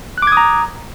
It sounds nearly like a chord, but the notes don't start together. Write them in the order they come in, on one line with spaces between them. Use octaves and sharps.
F#6 D6 G#6 D#6 A#5